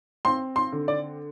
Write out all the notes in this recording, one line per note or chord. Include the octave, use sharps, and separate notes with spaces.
C4 C6
C6
D3
D5